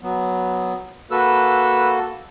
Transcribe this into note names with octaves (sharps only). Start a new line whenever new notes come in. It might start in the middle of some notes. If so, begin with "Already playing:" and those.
F#3 B3
A#3 F#4 A4 B4 E6